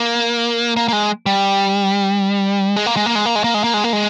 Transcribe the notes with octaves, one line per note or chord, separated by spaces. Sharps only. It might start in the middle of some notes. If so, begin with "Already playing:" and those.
Already playing: A#3
A#3
A#3
G#3
G3
G#3
A#3
G#3
A#3
G#3
A#3
G#3
A#3
G#3
A#3
G#3
A#3
G#3